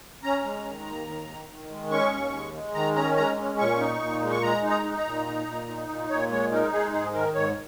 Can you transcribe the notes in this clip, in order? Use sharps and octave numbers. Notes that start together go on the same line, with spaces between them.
C#4 A#5
G#3
D#3
D#2
D#3
D#3
D#3
G#3
C#4 C#6
D#2
G#3
G#3
D#3 A#5
C#4 A#5
G#3 A#5
C#4
A#2 C#6
D#4
A#2
G#3
C#6
G#3 A#5
D#4
A#5
D#4
A#5
A#2
D#4
A#2
D#4
A#2
A#2 C#5
G#3 C#5
D#4 A#4
G#3 G#4
G#2 G#4
D#3 A#4
G#2 C#5